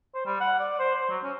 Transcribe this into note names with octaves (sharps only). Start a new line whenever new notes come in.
C5
G3
F#5
D5
C5
C5
F#3
C#4